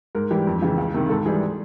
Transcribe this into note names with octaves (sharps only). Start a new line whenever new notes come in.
G#2 A#4
E3 G3 G4
F2
C#3 E3
C#2
C3 D#3
G#2 A4
E3 G3 G#4